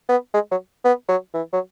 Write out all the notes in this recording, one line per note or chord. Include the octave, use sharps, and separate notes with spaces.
B3
G#3
F#3
B3
F#3
E3
F#3